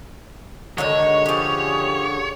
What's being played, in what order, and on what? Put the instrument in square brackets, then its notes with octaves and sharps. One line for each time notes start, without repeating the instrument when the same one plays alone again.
[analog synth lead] D3 [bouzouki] D#3 F#3 G#3 [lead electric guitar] C#5
[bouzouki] F3 C#4 [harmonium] G4 G#4